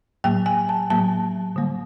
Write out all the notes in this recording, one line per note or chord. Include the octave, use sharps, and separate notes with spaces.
A2 F#3 A#3 G5
G#5
A5
A2 F#3 A#3 A5
D3 G3 A#3